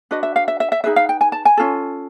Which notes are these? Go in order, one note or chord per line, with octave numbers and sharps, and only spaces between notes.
D4 F#4 B4 D#5
E5
F5
E5
E5
E5
D#4 G#4 B4 E5
F5
G5
G#5
A5
G#5
C#4 F4 A4